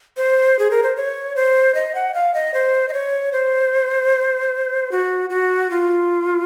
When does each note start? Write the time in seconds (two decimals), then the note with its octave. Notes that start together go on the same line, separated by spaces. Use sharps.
0.17 C5
0.59 G#4
0.71 A#4
0.83 C5
0.96 C#5
1.36 C5
1.75 D#5
1.95 F#5
2.14 F5
2.34 D#5
2.54 C5
2.89 D#5
2.93 C#5
3.32 C5
4.92 F#4
5.30 F#4
5.70 F4